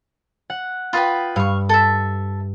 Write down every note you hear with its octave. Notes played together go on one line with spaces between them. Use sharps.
F#5
F4 B4 G5 B5 D#6
G2 F5 C#6
A4 E5